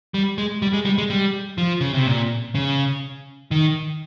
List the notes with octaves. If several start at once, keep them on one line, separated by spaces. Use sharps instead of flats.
G3
G#3
G3
G#3
G3
G#3
G3
F3
C#3
C3
A#2
C#3
D#3